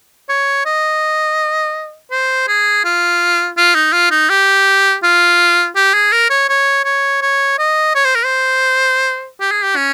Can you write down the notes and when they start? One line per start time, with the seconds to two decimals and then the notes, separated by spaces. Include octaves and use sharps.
0.29 C#5
0.66 D#5
2.11 C5
2.48 G#4
2.85 F4
3.57 F4
3.75 D#4
3.93 F4
4.11 D#4
4.30 G4
5.03 F4
5.76 G4
5.94 G#4
6.12 A#4
6.30 C#5
6.49 C#5
6.84 C#5
7.22 C#5
7.59 D#5
7.95 C#5
8.05 C5
8.15 A#4
8.25 C5
9.40 G4
9.52 G#4
9.63 G4
9.76 C#4